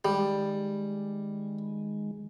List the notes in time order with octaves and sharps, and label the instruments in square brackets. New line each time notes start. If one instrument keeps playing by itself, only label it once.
[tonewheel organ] D#3 G#3 [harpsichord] G3